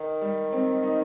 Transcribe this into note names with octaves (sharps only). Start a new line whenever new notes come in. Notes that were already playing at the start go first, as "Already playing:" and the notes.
Already playing: D#3
G3
C4
D#4